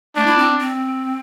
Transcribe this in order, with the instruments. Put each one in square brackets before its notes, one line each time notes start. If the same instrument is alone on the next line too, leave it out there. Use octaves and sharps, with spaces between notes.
[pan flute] A3 [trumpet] D4
[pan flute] E4
C4
C4